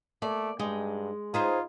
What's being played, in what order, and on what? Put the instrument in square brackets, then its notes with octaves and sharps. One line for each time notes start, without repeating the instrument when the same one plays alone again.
[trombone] A3 [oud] A#3 [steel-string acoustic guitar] D5
[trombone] G2 [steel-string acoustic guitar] G#3 [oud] D#4
[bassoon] D#4 [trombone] F4 [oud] G#4 B4 C5